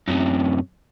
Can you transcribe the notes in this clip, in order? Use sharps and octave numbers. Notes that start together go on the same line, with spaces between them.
F#2 C3